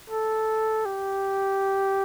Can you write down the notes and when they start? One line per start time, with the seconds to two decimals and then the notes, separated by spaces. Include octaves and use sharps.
0.10 A4
0.86 G4